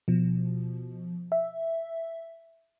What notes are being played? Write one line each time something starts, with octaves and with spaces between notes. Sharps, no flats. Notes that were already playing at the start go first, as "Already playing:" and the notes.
B2 F3
E5